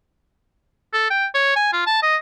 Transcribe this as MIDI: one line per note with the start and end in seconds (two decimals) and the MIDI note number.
0.93 1.06 69
1.10 1.26 79
1.34 1.53 73
1.56 1.69 80
1.72 1.86 65
1.86 2.00 81
2.02 2.16 75